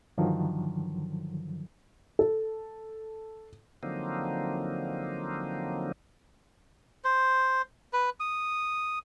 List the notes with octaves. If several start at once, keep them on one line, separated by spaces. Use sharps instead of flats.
G2 D3 D#3 F3 F#3
A4
D3 F3 F#3 A#3 C4 D#4
C5
B4
D#6